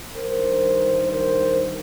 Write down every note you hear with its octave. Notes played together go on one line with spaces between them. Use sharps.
G2 D#3 A#4 C5
A#4 C5